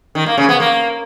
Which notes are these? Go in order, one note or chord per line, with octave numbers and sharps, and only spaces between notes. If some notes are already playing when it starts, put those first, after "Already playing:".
D#3
A#3
C#3
B3
A#3